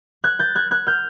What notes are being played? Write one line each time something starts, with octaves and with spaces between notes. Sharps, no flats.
F#6 G#6
G6 A6
F#6 G#6
F#6 G#6
F6 G6